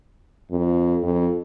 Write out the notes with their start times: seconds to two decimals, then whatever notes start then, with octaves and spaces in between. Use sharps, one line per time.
0.51 F2
1.03 F2